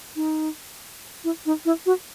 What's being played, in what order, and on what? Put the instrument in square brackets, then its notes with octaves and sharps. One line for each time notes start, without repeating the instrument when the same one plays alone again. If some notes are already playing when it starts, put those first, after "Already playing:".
[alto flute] D#4
E4
D#4
E4
F#4